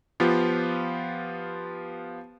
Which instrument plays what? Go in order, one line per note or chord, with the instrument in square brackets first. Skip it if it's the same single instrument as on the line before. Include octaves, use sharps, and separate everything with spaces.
[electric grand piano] F3 B3 F4 G4